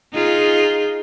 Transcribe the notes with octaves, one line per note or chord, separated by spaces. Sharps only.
D#4 F4 G#4